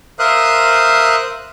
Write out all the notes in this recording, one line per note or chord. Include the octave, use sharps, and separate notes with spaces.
A#4 C5 E5 F5 D#6 F#6